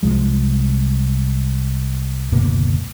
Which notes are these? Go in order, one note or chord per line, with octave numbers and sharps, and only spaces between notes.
C2 F3 G#3
F#1 D2 B2 A#3